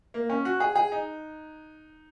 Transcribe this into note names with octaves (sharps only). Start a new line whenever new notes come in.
A#3
C#4
F#4
G#4
G#4
D#4